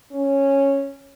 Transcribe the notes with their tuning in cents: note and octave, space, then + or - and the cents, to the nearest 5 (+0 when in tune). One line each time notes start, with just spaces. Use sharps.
C#4 -5